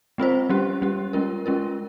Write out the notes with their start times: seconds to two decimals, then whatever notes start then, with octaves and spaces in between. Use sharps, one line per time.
0.18 G#3 C4 F4 C5
0.50 G3 C#4 G4
0.82 G3 C#4 G4
1.13 G#3 C#4 F4 A#4
1.46 G#3 C#4 F4 A#4